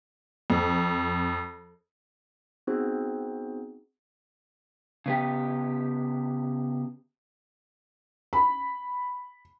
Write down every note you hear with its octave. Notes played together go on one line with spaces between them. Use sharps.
F2
B3 C4 D#4 F#4 G#4 C5
C#3 B3 G4
B5